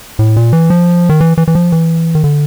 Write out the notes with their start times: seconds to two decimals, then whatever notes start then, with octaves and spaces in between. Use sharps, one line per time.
0.19 A2
0.36 A#2
0.53 E3
0.70 F3
1.09 D#3
1.21 E3
1.38 E3
1.48 E3
1.55 F3
1.72 E3
2.15 D#3
2.24 D3